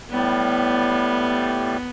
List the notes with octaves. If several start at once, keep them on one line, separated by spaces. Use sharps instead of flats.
A2 G3 B3